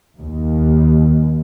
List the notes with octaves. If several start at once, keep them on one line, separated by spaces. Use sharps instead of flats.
D#2